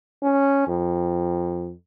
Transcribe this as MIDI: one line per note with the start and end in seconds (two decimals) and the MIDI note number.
0.23 0.63 61
0.68 1.72 41